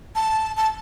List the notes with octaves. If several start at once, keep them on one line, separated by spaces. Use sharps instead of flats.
A5
A5